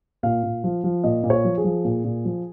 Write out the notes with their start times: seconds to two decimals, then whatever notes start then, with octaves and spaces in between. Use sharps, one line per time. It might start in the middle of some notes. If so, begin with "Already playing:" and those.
0.23 A#2 F5
0.43 A#2
0.64 F3
0.84 F3
1.04 A#2 D#5
1.24 A#2
1.30 C#5
1.45 F3
1.58 G#4
1.64 F3
1.85 A#2
2.04 A#2
2.25 F3